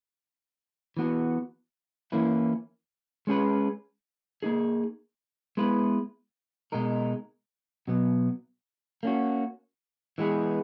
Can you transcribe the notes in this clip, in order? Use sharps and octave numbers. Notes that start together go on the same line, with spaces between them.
E3 B3 F#4
E3 A#3 C#4 E4 B4
G#3 C#4 G#4 B4
A#3 D#4 G#4
G#3 B3 E4 B4
B2 G#3 D#4 A#4
B2 F#3 B3
A#3 C#4 F#4
E3 G#3 B3 E4 G#4